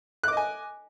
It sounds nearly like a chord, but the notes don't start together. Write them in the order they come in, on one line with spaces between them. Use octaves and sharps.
F#6 D6 D#5 G#5